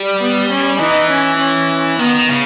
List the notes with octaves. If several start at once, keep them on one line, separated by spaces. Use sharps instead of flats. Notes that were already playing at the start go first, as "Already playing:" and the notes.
Already playing: G3
B3
C#4
E3 D#4
C#4
C#4
D#3 B3
C#3